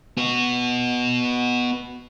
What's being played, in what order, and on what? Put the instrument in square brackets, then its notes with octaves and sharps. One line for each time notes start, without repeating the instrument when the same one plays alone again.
[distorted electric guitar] B3 F#4